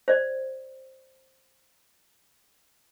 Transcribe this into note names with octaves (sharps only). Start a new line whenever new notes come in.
C5 D5